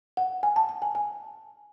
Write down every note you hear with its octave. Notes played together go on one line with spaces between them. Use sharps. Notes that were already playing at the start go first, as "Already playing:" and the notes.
F#5
G#5
A5
A5
G#5
G#5